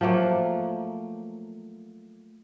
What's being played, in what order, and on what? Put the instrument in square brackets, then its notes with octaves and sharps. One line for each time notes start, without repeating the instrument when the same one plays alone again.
[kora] F3 F#3 A3 A#3